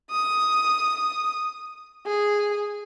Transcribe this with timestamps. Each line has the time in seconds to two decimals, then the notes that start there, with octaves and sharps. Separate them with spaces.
0.11 D#6
2.06 G#4